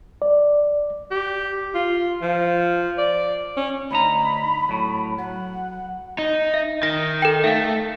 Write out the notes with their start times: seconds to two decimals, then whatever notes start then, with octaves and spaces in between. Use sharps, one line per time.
0.22 D5
1.11 G4
1.75 F4
2.22 F3
2.98 D5
3.57 C#4
3.91 D2 D#4 A#5 B5
4.69 A2 F#3
5.18 F#3 F#5
6.18 D#4
6.54 E5
6.83 D#3 A#6
7.22 A4 G5
7.44 A3 E5 F5